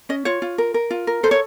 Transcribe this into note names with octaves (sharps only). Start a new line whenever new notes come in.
C#4 D#5
F4 C#5
F4
A#4
A#4
F4
A#4
A4 C5
C#5